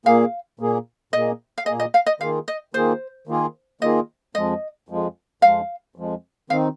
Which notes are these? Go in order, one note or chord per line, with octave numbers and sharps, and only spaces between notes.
A#2 A#3 G#4 F5
A#2 A#3 G#4
A#2 A#3 G#4 D#5
F5
A#2 A#3 G#4 D#5
D#5
F5
D#5
D#3 A#3 F4 G#4 F5
D#5
D#3 A#3 F4 G#4 C5
D#3 A#3 F4 G#4
D#3 A#3 F4 G#4 D#5
F2 F3 G#3 D#5
F2 F3 G#3
F2 F3 G#3 F5
F2 F3 G#3
D#3 C4 D#4 F5